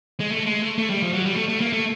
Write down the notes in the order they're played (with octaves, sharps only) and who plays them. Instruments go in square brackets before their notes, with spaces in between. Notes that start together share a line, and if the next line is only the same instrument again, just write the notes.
[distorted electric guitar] G#3
A3
G#3
A3
A3
G3
F3
F#3
G3
A3
A3
A#3
A3